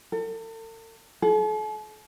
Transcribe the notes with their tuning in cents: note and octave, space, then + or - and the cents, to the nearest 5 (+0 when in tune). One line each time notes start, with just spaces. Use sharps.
A4 +40
A4 -45